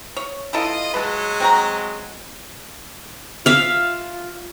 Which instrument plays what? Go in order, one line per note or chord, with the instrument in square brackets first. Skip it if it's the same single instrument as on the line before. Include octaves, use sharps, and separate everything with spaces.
[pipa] C#5
[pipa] E3 E4 A4 [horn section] F4 D#5
[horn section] F#3 G#3 [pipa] B4 A5
[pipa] C4 F#4 A#5
[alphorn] F4 [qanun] E5 F5